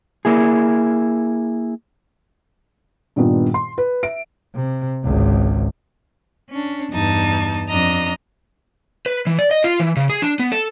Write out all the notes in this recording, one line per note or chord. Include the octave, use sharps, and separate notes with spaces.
A#3 E4 G#4
G2 A#2 D#3 B3
C6
B4
E5 D7
C3
G#1 C#2
C#4 D4
E2 G2 D#4 A5
F2 D4 D#5 A#5
B4
E3
D5
D#5
F4
E3
C#3
G#4
D4
B3
A4